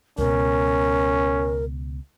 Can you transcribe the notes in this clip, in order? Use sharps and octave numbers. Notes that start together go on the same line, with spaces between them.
C#2 B2 C#4 A#4